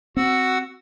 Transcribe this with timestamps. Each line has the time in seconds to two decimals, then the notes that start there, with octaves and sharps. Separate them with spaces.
0.17 C4 F#4 F#5 E6